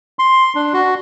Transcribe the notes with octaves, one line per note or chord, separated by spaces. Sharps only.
C6
D4
F#4